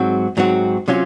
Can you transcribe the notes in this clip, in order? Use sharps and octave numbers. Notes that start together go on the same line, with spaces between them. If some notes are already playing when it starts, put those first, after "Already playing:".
Already playing: G#2 F#3 C4 F#4
G#2 F#3 C4 F#4
C3 F#3 C#4 F4